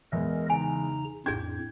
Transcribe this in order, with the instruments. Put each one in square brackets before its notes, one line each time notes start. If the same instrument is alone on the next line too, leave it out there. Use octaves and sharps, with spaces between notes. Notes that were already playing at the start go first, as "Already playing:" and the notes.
[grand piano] E2 G#3 E5 [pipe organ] A#4 D#5
[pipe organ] C#3 D#4 A#5 [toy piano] G#5
[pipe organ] F2 A2 [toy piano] D4 G#4 [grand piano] G6 G#6